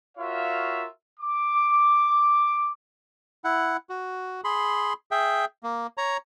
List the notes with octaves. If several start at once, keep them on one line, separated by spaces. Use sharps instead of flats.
F4 F#4 A#4 C#5 E5 F5
D6
E4 F#5
F#4
G#4 B5 C6
G#4 E5 G5
A#3
C#5 A#5